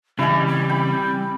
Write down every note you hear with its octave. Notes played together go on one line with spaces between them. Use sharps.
C#3 E3 G3 E4 D#5 G#5
C4
G5 B5